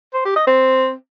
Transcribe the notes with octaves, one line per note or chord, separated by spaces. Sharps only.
C5
G4
D#5
C4